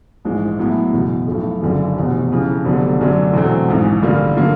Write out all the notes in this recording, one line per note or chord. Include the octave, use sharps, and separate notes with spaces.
A#1 G#2 E3 G#3
A2 F#3 B3 E4
F#1 E2 B2
B1 A2 F3 A3
F#1 F#2 D3 F3
F1 E2 B2
F2 C#3 E3
F1 F2 D3 F#3 B3
F#2 D3 F#3 A3 D4
E2 B2 F#3 A3 C4
A#1 G#2 E3
A1 G2 D3 F3 A#3
D3 F#3 A#3